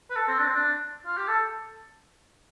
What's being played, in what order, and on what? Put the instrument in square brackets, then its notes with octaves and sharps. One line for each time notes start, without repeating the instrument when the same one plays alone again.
[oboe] B4
A4
C4
D4
C4
D4
F4
G4
A4